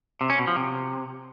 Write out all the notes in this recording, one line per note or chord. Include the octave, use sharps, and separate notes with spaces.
C3
C#4
B2
F3
C3